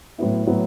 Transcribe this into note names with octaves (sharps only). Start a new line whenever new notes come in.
A2 F#3 B3 E4
A2 F#3 B3 E4